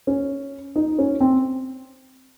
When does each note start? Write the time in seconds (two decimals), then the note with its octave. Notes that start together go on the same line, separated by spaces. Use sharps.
0.07 C#4
0.76 D#4
0.99 C#4
1.21 C4